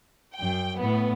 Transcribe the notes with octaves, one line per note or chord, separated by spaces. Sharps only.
F#2 G5
A2 B3